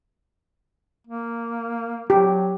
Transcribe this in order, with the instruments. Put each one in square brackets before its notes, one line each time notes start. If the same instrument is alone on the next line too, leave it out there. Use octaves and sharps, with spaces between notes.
[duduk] A#3
[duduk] F#3 [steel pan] G4